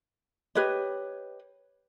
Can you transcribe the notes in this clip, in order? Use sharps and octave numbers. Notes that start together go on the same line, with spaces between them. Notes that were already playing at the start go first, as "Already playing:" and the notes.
G4 B4 C#5 D#5